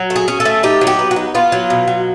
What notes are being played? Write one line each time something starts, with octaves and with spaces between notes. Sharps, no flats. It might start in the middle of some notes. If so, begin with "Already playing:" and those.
Already playing: F#3
A3
G#4
C#4
A4
A3
D#4 G4
F#3
G4
B3
F#4
D#4
B3 F4
F#3
B2
F#3